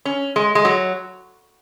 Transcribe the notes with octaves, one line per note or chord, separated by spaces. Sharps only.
C#4
G#3
G#3
F#3